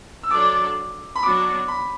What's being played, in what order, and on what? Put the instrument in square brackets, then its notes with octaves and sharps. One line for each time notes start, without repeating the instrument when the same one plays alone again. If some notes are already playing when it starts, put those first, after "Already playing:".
[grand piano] E6
[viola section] F#3 D4 A4 D5 [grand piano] D6
[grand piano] B5
[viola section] F#3 B3 D4 F#4 [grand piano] D6
[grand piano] B5